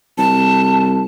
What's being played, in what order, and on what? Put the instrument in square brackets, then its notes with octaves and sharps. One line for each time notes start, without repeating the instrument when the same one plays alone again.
[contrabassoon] C2 [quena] A5